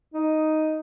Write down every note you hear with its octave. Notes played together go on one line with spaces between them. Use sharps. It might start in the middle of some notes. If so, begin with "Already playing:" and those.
D#4